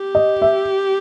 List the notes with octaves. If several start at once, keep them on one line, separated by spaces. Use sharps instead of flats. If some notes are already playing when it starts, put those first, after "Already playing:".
Already playing: G4
D#5
E5